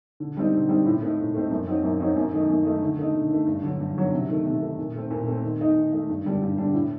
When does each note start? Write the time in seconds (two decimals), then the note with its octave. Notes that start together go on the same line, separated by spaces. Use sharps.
0.20 D3
0.37 G3 C4 D#4
0.53 D3
0.69 G3 C4 D#4
0.85 A2
1.02 A3 C4 D#4
1.19 A2
1.34 A3 C4 D#4
1.51 F#2
1.67 F#3 C4 D#4
1.83 F#2
2.00 F#3 C4 D#4
2.17 F#2
2.33 D#3 A3 D#4
2.49 F#2
2.65 D#3 A3 D#4
2.82 D3
2.98 A3 D#4
3.15 D3
3.31 A3 D#4
3.46 G2
3.63 D3 F#3
3.80 G2
3.97 D3 F#3
4.12 C3
4.29 D#3 A3
4.46 C3
4.62 D#3 A3
4.78 A#2
4.95 A3 C4
5.11 A#2
5.27 A3 C4
5.43 D#3
5.59 A3 D#4
5.75 D#3
5.93 A3 D#4
6.09 G2
6.25 D3 G3 D4
6.42 G2
6.58 D3 G3 D4
6.74 A2